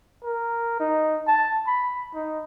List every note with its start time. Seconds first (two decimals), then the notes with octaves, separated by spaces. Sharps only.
0.24 A#4
0.79 D#4
1.27 A5
1.67 B5
2.14 D#4